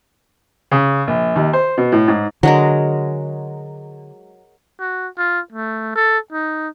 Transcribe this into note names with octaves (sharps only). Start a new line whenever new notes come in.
C#3
A#1
D#2
C5
B2
A2
G#2
D3 F#3 G#3 A#4
F#4
F4
A3
A4
D#4